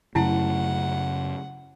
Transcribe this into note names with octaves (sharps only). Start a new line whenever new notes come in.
F#2 C#3 A3 E4 F#5 A5